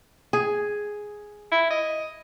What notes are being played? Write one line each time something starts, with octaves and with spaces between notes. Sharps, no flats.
G#4
E4
D#5